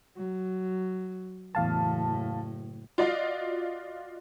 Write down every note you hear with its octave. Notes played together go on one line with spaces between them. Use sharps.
F#3
F#1 E2 A2 F5 A5
F4 F#4 D5 D#5 F5